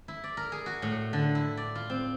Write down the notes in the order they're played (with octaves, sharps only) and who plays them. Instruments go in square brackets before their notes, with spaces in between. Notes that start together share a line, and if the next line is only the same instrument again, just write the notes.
[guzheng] E4
D5
A#4
G#4
F#4
A2
D3
E4
D5
F4
C4